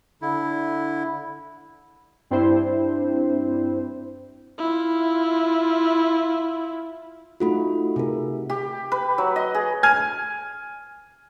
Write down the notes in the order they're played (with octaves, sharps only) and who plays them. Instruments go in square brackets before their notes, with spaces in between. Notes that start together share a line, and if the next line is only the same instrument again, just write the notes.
[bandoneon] D3 E4
[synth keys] G2 C4 D4 E4 C5
[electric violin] E4 F4
[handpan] A3 D#4 F#4 [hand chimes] F4 A4 B5
[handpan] C3 [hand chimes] G#4 A#4
[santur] G4
B4
F#3
D#5
G#4
[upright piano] G#5 F6 G#6